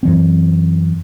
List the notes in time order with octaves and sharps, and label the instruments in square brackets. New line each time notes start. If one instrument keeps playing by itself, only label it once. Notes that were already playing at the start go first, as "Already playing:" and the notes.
[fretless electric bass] F#2 E3 C4